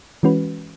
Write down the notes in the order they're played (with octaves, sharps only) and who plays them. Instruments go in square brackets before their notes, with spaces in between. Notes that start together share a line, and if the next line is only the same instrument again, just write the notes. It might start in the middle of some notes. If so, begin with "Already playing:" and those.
[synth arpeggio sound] E3 G#3 C#4 F#4 B4